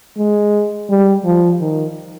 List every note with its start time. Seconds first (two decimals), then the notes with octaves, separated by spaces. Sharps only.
0.18 G#3
0.90 G3
1.25 F3
1.61 D#3